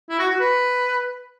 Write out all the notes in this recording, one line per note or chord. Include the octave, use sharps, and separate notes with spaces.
E4
F#4
F#4
B4